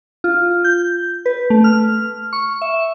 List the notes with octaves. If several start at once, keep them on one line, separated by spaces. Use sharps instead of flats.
F4
G6
B4
A3
F6
C#6
E5